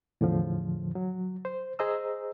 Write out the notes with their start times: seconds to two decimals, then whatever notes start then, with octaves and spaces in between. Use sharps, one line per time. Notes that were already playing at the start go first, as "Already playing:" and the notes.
0.21 E2 A2 D3 F3
0.95 F#3
1.45 C5
1.79 G#4 C5 D#5 A#5 E6